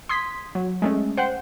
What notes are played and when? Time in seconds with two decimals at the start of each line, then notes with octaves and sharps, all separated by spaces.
0.09 C6 D#6 G#6 B6
0.55 F#3
0.82 G#3 A3 C#4
1.17 C5 F#5 G5